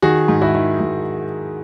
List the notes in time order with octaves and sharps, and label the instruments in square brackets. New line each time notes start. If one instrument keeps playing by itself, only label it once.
[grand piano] D#3 F#4 G#4
G#2
E4 F#4
D#3
G#2